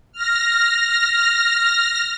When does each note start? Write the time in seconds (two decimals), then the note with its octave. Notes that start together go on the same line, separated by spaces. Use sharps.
0.12 F6 A#6